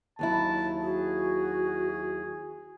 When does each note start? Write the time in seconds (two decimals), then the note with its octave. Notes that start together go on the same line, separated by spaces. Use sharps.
0.19 D#2 F#3 E4 A5
0.81 F#4 G#4